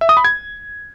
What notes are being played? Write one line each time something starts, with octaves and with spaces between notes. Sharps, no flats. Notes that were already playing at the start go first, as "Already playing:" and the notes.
E5
D#6
B5
G#6